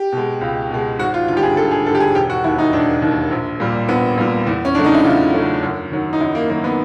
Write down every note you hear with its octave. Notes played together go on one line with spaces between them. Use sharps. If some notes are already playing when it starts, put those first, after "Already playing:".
Already playing: G4
B2 G#3
C#2
B2 G#3
G#1 F#4
F4
G2 D3 F4 G4
G#4
G#1 A4
G#4
G2 D3 A4
G4
G#4
E1 G4
F#4
D#2 D#3 E4
D#4
E1 D4
D#2 D#3
A#1
A#2 G3
A#1 B3
A#2 G3
E2
C#4
C#3 F#3 A3 D4
D#4
E4
E2 F4
C#3 F#3 A3
F#2
D#3 F#3
D#4
F#2 E4
A#3
D#3 F#3 A#3
B3